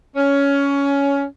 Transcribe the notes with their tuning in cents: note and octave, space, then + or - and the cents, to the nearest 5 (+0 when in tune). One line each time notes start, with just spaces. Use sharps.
C#4 +15